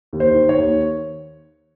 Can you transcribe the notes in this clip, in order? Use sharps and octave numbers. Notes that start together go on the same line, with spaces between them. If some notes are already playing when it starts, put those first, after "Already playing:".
D#2
C5
D#3
C#5
D#2